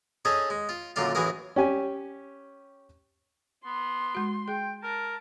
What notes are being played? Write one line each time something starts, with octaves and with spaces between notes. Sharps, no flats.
C#4 D#4 G#4 A4
G#3
F4
F#2 A#2 D3 F4 F5
A1 E3 F#4 G#4 A#4
C#4 G4 G#5
B3 C6
G#3 F#4
G#4 G5
A#4 A5